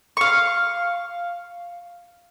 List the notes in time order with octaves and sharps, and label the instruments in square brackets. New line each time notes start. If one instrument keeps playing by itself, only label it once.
[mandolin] F5 C#6